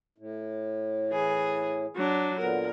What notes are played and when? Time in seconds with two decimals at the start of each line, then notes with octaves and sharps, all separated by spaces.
0.18 A2
1.09 E3 G#4
1.95 F#3 D4
2.39 A#2 D3 B3 A#4